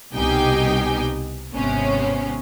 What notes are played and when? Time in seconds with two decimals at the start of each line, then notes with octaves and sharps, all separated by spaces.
0.15 C2 B2 D#4 G4 G5 G#5
1.53 G#1 C3 B3 C#4